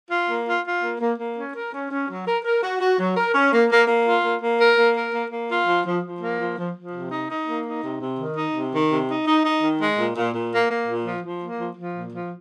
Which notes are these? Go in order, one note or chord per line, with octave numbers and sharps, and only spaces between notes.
F4
A#3
F4
F4
A#3
A#3
A#3
C#4
A#4
C#4
C#4
F#3
A#4
A#4
F#4
F#4
F#3
A#4
C#4
A#3
A#3
A#3
F4
A#3
A#3
A#4
A#3
A#4
A#3
A#3
F4
F3
F3
F3
A#3
F3
F3
F3
C3
D#4
D#4
A#3
D#4
C3
C3
D#3
D#4
C3
D#3
C3
D#4
D#4
D#4
D#3
G#3
A#2
A#2
A#2
A#3
A#3
A#2
F3
F3
A#3
F3
F3
A#2
F3